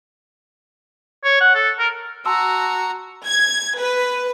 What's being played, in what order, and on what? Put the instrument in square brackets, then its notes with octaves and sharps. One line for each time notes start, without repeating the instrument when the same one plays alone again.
[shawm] C#5
F#5
A4
A#4
[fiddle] F#4 A#5 [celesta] A5 C6 E6
[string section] G#6
B4